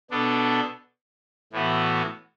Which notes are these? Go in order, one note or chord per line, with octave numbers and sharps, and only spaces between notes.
B2 B3 D4 A4
A2 E3 B3 F#4